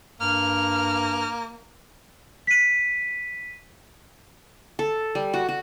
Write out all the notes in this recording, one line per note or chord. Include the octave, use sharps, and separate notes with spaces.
G2 A#3 F6
B6 D#7
A4
G3
F#4
F#4